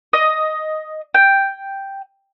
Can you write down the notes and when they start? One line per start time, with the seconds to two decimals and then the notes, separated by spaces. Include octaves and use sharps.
0.13 D#5
1.14 G5